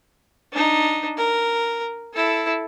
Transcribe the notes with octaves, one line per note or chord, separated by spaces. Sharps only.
D4 D#4
A#4
E4 A4